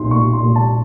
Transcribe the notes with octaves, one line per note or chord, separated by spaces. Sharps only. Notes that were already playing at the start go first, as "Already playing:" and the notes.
Already playing: B1 A#2 C6
A#2 C#6
C6
A#2
A5